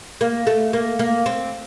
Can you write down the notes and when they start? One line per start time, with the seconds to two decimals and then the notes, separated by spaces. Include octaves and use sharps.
0.21 A#3
0.47 A3
0.73 A#3
0.99 A#3
1.26 C4